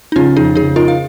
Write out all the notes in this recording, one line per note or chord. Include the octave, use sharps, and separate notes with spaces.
D#4
C#3 C#4 F4
F2 D#4 G#4
C#3 D#4 G#4
D#4 F4 A#4
F5